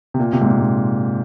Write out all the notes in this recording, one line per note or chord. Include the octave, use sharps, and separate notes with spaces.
C3
A#2
C3
G#2
A#2
G#2